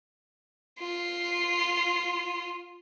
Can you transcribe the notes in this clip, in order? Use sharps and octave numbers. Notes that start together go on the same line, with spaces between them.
F4 C7